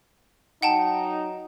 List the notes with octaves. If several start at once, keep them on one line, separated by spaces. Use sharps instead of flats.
F#3 D#4 F#5 G5 A5